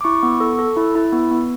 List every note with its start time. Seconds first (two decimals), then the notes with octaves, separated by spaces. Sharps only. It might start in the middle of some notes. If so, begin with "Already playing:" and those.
0.01 D6
0.04 E4 C#6
0.23 B3
0.40 A4
0.59 A4
0.77 E4
0.95 E4
1.13 B3
1.31 B3